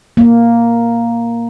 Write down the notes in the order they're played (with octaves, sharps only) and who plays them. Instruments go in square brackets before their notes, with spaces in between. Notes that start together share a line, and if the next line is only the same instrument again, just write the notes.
[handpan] A#3